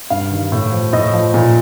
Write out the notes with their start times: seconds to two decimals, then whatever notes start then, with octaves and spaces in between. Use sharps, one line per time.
0.10 G2 F5
0.31 D#3 G3
0.52 A2
0.72 F3
0.93 A2 D#5
1.13 F3
1.34 A#2